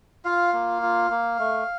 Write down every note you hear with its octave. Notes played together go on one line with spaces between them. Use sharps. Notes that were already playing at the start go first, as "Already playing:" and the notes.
F4 F5
A#3
F4
A#3
A3